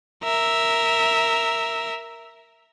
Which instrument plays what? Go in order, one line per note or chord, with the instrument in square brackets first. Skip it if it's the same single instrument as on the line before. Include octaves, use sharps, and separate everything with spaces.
[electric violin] A#4 E5